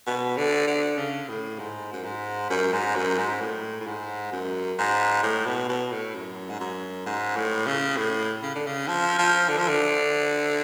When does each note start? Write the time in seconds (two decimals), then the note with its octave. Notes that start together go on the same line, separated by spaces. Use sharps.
0.07 B2
0.37 D3
0.67 D3
0.98 C#3
1.29 A2
1.59 G#2
1.93 F#2
2.04 G#2
2.50 F#2
2.72 G#2
2.95 F#2
3.18 G#2
3.41 A2
3.81 A2
3.86 G#2
4.32 F#2
4.78 G#2
5.23 A2
5.46 B2
5.69 B2
5.92 A2
6.14 F#2
6.49 G#2
6.60 F#2
7.06 G#2
7.36 A2
7.66 C#3
7.97 A2
8.43 C#3
8.55 D3
8.66 C#3
8.88 F3
9.18 F3
9.49 D3
9.58 F3
9.68 D3